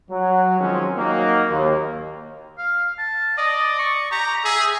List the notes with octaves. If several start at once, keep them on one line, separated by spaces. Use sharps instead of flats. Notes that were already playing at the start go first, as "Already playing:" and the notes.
F#3
D#3 F3 F#3 G#3 C4 C#4
F#3 A#3 D#4
D#2
F5
A5
D5 D#5
C#6
G4 A#5
G#4 E5